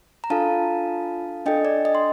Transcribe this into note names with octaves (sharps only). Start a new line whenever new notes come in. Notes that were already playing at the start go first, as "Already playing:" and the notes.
A#5
D4 F4 A4 F5 A5
D4 A4 D#5 G5
D5
D#5
C6